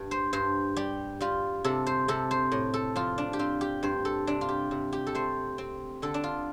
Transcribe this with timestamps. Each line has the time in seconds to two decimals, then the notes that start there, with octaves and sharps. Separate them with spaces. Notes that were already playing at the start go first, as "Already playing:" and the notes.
Already playing: G2
0.11 C5
0.33 G2 C5
0.76 G3 G4
1.21 G3 F4
1.64 C3 A4
1.87 C5
2.08 C3 A4
2.31 C5
2.52 A2
2.74 A4
2.96 F3 F4
3.18 D4
3.33 G4
3.39 C4 F4
3.61 G4
3.83 G2 C5
4.05 A4
4.27 C3 D4
4.41 F4
4.49 G4
4.71 C3
4.93 G4
5.07 A4
5.15 A3 C5
5.58 C4
6.02 D3 A4
6.14 D4
6.24 F4